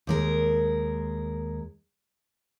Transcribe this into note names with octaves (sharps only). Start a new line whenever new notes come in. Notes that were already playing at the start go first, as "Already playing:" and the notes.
D#2 G#3 A#4